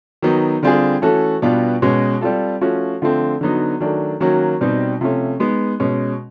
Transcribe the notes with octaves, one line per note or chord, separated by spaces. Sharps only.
D#3 F#3 B3 D#4
D3 G3 C4 F4 G#4
E3 A3 C#4 F#4 A4
B2 G3 B3 D4 F4
B2 G#3 C#4 F#4
G3 C4 F4 A4
F3 A3 C#4 F#4
D3 F3 A3 C4
D3 F#3 B3 D#4
D#3 F#3 A3 D4
D#3 F#3 A#3 C#4 F#4
B2 G3 C4 D#4
C3 F3 A3 C#4
G#3 B3 D#4
B2 G#3 C#4